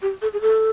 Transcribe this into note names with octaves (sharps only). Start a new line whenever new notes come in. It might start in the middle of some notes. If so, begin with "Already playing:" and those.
G4
A4
G#4
A4